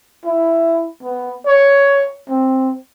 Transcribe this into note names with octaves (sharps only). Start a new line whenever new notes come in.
E4
B3
C#5
C4